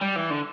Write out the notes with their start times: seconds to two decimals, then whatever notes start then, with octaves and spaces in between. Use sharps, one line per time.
0.02 G3
0.16 E3
0.31 D3